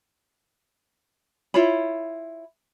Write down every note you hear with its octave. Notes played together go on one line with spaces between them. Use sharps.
E4 F4 C#5 B5